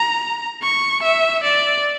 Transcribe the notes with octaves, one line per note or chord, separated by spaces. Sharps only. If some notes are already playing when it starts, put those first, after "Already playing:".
Already playing: A#5
C#6
E5
D5